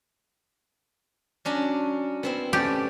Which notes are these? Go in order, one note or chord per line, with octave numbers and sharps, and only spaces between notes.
F#3 C#4 D4
B3 C4 E4
A3 C#4 G4 D5